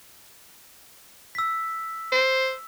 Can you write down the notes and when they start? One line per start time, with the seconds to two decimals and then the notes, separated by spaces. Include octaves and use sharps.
1.35 E6 B6
2.12 C5